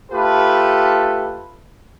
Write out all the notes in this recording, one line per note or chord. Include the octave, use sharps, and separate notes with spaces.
A3 F4 G4 A4 B4